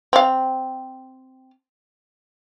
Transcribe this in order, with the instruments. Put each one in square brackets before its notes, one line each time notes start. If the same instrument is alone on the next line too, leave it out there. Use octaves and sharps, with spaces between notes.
[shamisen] C4 F5